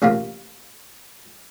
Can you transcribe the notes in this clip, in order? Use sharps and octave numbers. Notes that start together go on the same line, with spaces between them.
A1 C3 A#3 F4